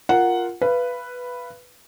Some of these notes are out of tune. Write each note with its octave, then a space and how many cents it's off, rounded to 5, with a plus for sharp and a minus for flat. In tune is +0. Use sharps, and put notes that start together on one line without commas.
F4 +0 A#4 +0 F#5 +0
B4 +0 F5 -35